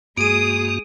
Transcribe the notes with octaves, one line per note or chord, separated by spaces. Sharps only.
G2 G#3 A#3 F#4 G#4 D#6 D7 D#7